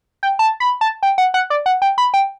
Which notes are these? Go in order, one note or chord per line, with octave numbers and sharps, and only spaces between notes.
G5
A5
B5
A5
G5
F#5
F#5
D5
F#5
G5
B5
G5